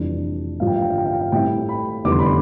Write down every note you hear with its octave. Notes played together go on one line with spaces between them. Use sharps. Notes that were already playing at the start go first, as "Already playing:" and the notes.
Already playing: F1 F2 E3 G3 D4
A1 G2 F3 F5
G5
F5
G5
F5
G5
F5
G5
F5
A2 G3 C4 E4 G5
B5
F1 E2 D3 G3 D6
C6
B5
C6